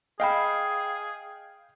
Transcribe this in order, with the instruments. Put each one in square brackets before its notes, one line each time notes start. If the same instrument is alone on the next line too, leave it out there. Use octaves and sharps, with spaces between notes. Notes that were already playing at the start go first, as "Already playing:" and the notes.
[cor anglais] G#4 [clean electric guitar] D#5 B5 [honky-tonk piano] F5 G5